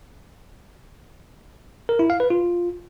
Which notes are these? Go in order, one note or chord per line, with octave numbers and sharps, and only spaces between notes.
A#4
E4
F5
B4
F4